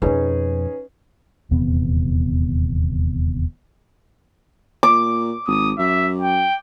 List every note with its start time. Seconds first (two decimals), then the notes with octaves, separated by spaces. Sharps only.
0.02 F2 B2 C#4 D#4 G#4 B4
1.51 D#1 E2 C3 B3
4.83 A#2 D6
5.47 G#1 D#6
5.78 F#2 E5
6.21 G5